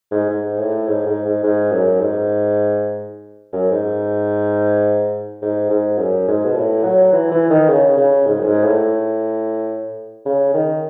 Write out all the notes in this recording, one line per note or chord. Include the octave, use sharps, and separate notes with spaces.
G#2
G#2
A2
G#2
G#2
G#2
G#2
F#2
G#2
F#2
G#2
G#2
G#2
F#2
G#2
B2
A2
F#3
E3
E3
D#3
C#3
C#3
G#2
F#2
G#2
A2
C#3
D#3